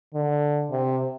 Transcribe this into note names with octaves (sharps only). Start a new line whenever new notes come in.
D3
C3